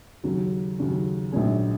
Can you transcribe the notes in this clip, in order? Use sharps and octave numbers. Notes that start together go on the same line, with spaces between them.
D#2 C#3 F#3
D#2 C#3 F#3
A#1 G#2 F#3 C#4 G#4